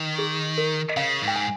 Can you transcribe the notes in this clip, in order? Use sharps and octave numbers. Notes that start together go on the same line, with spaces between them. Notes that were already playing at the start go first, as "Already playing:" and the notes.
Already playing: D#3
G#4
A#4
D#5
C#3 F5
G#2
G5
G#5